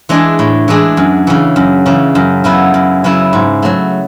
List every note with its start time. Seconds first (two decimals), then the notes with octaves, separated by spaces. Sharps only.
0.09 E3 G#3 D4 G#4
0.39 A2
0.68 E3 G#3 D4 G#4
0.97 F#2
1.27 C#3 E3
1.56 F#2
1.86 C#3 E3
2.15 F#2
2.44 C#3 F#3 B3 E4
2.74 F#2
3.04 C#3 F#3 B3 E4
3.33 G#2
3.62 F#3 A3